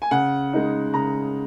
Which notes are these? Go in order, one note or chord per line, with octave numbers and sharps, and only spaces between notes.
G#5
C#3 F#5
G#3 D#4
C#3 A#5